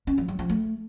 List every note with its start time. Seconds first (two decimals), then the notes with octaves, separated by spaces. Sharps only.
0.07 C#4
0.18 F3
0.28 F#3
0.39 F3
0.49 A3